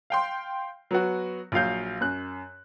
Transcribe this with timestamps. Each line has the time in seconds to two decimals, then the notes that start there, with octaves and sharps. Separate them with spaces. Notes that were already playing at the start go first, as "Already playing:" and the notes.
0.10 F5 G5 C6
0.91 F#3 B3 F#4
1.52 A#1 F#3 F5 G6
2.01 F#2 F#6